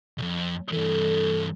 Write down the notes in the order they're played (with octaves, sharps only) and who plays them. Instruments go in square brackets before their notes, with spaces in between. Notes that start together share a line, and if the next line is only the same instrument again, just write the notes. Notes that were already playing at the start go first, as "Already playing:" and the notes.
[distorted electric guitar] B1 F2
[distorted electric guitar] G2 E3 [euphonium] A4